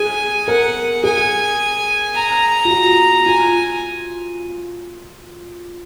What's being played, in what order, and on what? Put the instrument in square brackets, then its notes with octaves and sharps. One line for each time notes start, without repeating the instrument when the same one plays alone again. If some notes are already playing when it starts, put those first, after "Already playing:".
Already playing: [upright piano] G#4 [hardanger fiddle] G#5
[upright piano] A#4 [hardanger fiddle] F#5
[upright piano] G#4 [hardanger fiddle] G#5
[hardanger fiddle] A#5
[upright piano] F4
F#4
[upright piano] F4 [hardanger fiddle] G#5